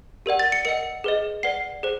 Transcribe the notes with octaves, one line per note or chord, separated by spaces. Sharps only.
G4 A#4 D5 F#5
A6
C#7
A#4 D#5 F#5 C#7
G#4 B4 D#5
B4 D5 F#5 C7
G#4 C5